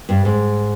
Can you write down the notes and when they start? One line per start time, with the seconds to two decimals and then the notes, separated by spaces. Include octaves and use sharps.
0.09 G2
0.25 G#2